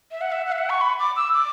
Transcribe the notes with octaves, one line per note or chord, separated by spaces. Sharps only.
E5
F#5
E5
F#5
E5
F#5
C#6
B5
D6
E6
D6